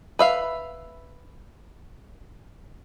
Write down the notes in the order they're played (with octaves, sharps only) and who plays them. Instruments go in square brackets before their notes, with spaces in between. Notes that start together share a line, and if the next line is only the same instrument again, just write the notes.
[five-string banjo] B4 E5 F5